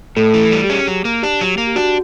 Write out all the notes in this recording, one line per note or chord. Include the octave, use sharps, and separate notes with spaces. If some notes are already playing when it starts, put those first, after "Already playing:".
A2 A3 A4
E3
G3
G4
C#4 G#4
F#3
A#3
D4 G4
F#3
A#3
G4
D4 F#4